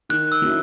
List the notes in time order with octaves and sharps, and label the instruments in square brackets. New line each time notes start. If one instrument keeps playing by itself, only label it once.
[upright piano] D#3 [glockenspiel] F#6
[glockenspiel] E6
[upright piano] F#3 C#4 E4